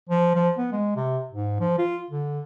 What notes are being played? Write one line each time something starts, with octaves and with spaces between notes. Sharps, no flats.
F3
F3
B3
G#3
C3
G#2
F3
F4
D3